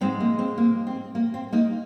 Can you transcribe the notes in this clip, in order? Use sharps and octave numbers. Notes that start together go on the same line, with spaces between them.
G#2 F3 G#3 C4
A#3
C4
A#3
C4
A#3
C4
A#3 D#4